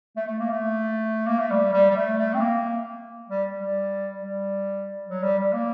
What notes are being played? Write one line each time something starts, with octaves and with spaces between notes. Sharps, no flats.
A3
A3
A#3
A3
A#3
A3
G3
G3
G3
A3
A3
C4
A#3
G3
G3
G3
F#3
G3
G3
A#3